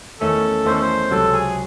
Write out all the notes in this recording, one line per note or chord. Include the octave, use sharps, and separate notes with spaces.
E2 D#3 A3 C#4 A4
E2 D#3 A3 C#4 C5
A4
C5
C#2 C3 F#3 A4
G#4